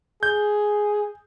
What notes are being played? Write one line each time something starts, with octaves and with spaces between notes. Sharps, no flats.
G#4 G6